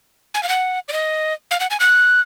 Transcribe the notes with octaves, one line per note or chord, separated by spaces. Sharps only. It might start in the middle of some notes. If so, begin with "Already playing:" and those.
G#5
F5
F#5
D5
D#5
F5
F#5
G#5
F#6